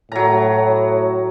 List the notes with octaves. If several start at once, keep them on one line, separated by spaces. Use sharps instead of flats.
A2 F#3 A#5